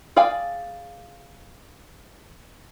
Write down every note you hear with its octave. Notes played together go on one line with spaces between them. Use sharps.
G#4 D5 F5 G5 G#5